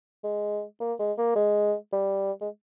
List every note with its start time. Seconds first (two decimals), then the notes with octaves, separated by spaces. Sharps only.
0.24 G#3
0.80 A#3
1.00 G#3
1.18 A#3
1.36 G#3
1.93 G3
2.41 G#3